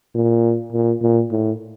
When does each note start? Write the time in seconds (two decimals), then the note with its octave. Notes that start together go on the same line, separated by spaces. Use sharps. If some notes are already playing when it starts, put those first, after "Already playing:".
0.15 A#2
0.73 A#2
1.02 A#2
1.31 A2